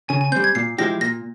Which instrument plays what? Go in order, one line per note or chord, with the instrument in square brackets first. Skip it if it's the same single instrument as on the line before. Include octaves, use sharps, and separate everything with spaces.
[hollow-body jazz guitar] C#3 [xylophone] G#5
[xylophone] G#5
[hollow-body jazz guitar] G3 C4 [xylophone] G6
[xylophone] G#6
[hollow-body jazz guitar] A#2 [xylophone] C7
[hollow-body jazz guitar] F3 G#3 E4 G4 [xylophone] A#6
[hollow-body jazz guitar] A#2 [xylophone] A#6